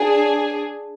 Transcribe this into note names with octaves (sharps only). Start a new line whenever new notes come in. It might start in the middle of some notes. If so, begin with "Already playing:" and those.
Already playing: D4 G#4